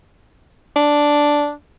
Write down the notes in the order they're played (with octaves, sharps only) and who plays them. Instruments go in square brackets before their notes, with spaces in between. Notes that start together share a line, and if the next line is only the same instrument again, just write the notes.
[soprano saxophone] D4